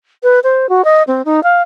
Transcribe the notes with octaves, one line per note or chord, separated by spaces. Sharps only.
B4
C5
F#4
D#5
C4
D#4
F5